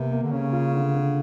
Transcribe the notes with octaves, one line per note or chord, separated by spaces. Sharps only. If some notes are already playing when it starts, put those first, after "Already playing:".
Already playing: C3 A#3 B3
A#3
D3
C#3 C#4
F4
D3
D3